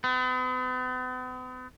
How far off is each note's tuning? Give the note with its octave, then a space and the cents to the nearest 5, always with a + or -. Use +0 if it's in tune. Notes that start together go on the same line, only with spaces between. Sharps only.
B3 +45